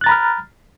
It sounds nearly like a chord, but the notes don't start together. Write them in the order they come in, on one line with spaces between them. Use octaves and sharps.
F#6 A6 A#5 B5 F6